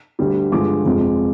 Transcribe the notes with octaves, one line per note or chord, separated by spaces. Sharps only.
D2 D3 G3
G2 D3 F3 G#3 D6
F2 C3 F3 G#3